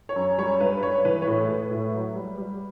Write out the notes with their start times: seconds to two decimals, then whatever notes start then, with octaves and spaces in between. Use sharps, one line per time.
0.09 C#5
0.16 F#2
0.38 G3 C#5
0.60 G2 B4
0.82 G2 C#5
1.05 E3 B4
1.22 C#5
1.27 A2 B4
1.48 A2
1.71 A2
1.93 F#3
2.16 G3
2.37 G3